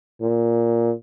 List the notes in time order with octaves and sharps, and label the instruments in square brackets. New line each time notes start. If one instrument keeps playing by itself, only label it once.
[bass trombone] A#2